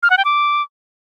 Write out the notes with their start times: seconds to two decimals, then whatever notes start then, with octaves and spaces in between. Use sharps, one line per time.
0.03 F6
0.10 F#5
0.18 G5
0.25 D6